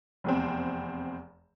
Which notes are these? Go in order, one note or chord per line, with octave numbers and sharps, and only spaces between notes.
F1 E2 C4